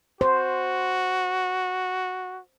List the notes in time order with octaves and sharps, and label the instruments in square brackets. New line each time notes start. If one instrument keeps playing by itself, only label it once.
[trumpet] F#4 [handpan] C5